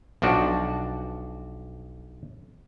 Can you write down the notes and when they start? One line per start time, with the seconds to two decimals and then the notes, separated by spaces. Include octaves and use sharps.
0.22 B1 F3 D4 F#4